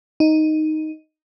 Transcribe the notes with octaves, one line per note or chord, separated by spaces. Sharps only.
D#4